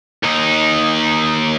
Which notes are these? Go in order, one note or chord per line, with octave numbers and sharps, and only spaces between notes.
D#2 D#4